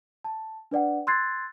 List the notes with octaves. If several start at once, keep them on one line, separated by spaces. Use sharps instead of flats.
A5
D4 B4 D5 F#5 G5
C6 E6 F#6 G#6 A6 C7